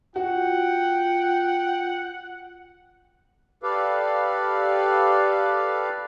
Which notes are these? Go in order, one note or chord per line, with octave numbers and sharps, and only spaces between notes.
F4 F#4 F#5 G5
G4 A4 B4 D5 F5